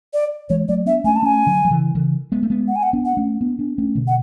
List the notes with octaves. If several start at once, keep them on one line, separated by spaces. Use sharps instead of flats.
D5
E3 G#3 C#5
F#3 A3 D5
B3 D4 E5
A3 C#4 G#5
A5
A3 C#4 G#5
D3 F#3
F#3
C#3 E3
C#3 E3
G#3 B3
A3
G#3 B3
F#5
G#5
F#5
B3 D4
F#5
A3 C#4
B3 D4
B3 D4
A3 C#4
B2 D3
F#5